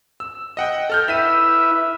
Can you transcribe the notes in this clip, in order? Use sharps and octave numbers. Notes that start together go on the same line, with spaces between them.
E6
D#5 F#5 G5
A4 F6 G6
E4 B4 E5 E6 B6 D#7